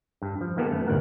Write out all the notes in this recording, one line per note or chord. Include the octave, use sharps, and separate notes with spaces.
G2
F3
D#3 A#3 B3 G4 A4
F#2 A3 B3
G1 D2 A2 A#4 F#5 A#5